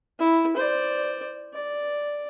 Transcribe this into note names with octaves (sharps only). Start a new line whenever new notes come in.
E4
C5 D5
D5